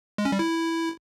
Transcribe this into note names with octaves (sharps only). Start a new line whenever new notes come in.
G#3
C#4
G3
E4